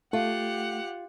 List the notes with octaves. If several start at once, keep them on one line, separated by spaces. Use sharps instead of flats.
A3 F4 G4 F#5